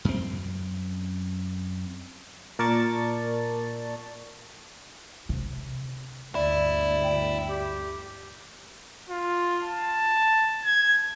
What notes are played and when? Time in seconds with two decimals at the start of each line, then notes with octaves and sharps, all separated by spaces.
0.05 F#2 C4
2.59 A#2 A#4 D5 A5 C#6 A6
5.29 C3
6.35 G1 D2 E4 D5
7.04 G5
7.49 G4
9.10 F4
9.64 A5
10.65 G#6